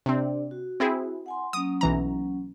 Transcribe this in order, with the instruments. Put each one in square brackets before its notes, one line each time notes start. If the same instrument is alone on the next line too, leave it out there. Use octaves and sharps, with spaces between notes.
[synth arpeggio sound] C3 C4 [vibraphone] D4 D5
[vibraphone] F#4
[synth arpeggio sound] C4 E4 G#4
[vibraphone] F#5 G#5 C6
[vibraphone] F#3 A#3 C#4 [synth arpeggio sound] D#6
[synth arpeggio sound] B1 E3 A#5